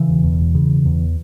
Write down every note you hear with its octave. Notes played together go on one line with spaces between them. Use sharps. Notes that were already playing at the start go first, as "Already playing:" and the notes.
Already playing: C#3 E3
E1
E2
E1
C#3
E1
E2